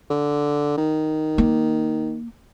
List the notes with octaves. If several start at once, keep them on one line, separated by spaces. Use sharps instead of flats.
D3
D#3
A#3